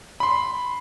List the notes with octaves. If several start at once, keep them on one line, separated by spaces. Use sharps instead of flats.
B5 C6